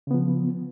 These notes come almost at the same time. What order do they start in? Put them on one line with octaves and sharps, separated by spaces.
C#3 B3 F3